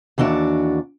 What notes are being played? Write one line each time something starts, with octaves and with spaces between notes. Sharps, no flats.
D#2 E3 D4 F#4 D5